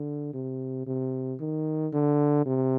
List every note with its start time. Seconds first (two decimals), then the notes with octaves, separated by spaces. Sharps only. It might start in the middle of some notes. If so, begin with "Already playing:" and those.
Already playing: D3
0.34 C3
0.87 C3
1.40 D#3
1.93 D3
2.46 C3